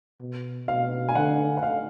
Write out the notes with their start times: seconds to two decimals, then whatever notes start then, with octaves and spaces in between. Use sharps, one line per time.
0.20 B2
0.68 B2 F5
1.09 G#5
1.15 D3 F#5
1.57 F#5
1.63 F5